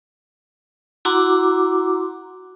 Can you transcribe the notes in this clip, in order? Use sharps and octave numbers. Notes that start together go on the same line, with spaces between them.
E4 F#4 F#5 A#5 C6 D6